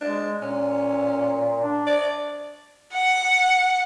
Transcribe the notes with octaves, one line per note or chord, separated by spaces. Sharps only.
G#3 D4
A#2 C#4
D4
D5
F#5